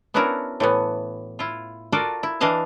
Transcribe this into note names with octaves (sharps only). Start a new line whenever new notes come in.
B3 C#4 D4 E4 F#4 A#4
A2 E3 B3
E4 F4
F4 F#4 A4 A#4 D5
E4
E3 D4 D#5 F5 A5